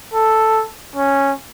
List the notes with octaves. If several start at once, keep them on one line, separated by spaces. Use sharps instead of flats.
A4
C#4